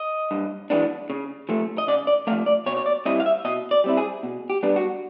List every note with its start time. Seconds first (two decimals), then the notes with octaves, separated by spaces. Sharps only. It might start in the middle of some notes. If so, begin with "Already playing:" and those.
Already playing: D#5
0.31 G2
0.70 E3 G#3 B3 D4
1.10 C#3
1.49 F3 A3
1.78 D#5
1.88 C#3 D5
2.07 D5
2.27 A3 F5
2.31 F3
2.46 D5
2.66 B2 C#5
2.77 C#5
2.86 D5
3.05 G3 C4 E4 D#5
3.20 F5
3.26 E5
3.45 B2 D#5
3.71 D5
3.84 G3 C4 E4
3.97 G#4
4.23 B2
4.50 G4
4.63 G3 B3 D4
4.76 F#4